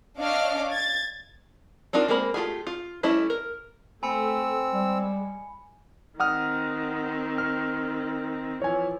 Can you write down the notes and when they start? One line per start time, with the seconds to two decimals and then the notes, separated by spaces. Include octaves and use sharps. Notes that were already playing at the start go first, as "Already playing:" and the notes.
0.18 D4 C#5 D#5 F5 D6 F6
0.70 G#6 A6
1.93 C4 D4 D#4 F4 A#4
2.08 G#3 A#3 C4 A#4 B5
2.34 A3 F4 G4 G#4
2.67 F4
3.03 G3 A3 C#4 E4 D#5
3.30 A#4
4.03 A3 C4 G#5 B5 E6 C#7
4.73 G3 G#3
6.20 D#3 C4 F#5 D#6 F6
7.38 F6
8.62 E3 F3 C#5 G#5